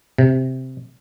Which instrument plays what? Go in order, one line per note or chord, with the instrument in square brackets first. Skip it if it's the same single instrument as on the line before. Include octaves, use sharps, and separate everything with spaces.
[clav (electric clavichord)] C3